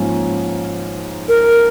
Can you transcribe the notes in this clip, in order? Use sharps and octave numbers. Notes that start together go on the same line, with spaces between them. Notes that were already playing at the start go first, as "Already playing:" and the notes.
Already playing: G#2 F3 A#3 C#4
A#4